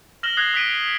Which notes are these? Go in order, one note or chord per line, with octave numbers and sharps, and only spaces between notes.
F6 A#6 E7 F#7 G7
D#6 F#6 G#6 A#6 C7
D#6 B6 D7 D#7